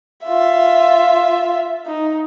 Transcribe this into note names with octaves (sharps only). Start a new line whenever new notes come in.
F4 E5
D#4